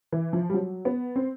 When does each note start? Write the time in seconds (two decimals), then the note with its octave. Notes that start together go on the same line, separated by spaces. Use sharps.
0.12 E3
0.33 F3
0.50 G3
0.54 F#3
0.85 B3
1.16 C4